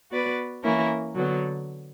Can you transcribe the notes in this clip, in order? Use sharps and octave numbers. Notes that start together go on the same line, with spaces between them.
B3 F#4 B4 D5
E3 A#3 C#4 E4 A#4
D3 F#3 B3